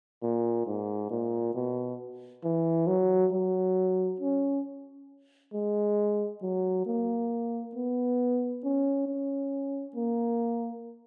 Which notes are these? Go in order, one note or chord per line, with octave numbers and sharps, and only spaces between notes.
A#2
G#2
A#2
B2
E3
F#3
F#3
C#4
G#3
F#3
A#3
B3
C#4
C#4
A#3